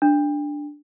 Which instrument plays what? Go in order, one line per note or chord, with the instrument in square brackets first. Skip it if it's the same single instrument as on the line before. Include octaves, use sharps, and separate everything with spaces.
[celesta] D4